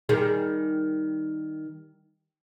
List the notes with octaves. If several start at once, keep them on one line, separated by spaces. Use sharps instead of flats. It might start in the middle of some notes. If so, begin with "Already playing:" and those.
D#3 G3 G#4